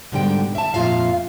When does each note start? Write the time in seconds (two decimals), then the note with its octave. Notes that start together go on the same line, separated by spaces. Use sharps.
0.12 G#2 B2 D3 G3 G5
0.55 E5 A5
0.74 F2 A#2 F4 E5 F5